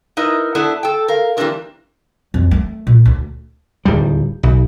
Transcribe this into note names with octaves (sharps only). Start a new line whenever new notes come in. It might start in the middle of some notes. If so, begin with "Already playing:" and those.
D#4 E4 A#4 B4 D#5
B3 D4 E4 A4
A4 G5
A#4 F5
E3 G3 A#3 C4 D4 A#4
F2
A3
A#2
D2
D1 D#2 G3
B1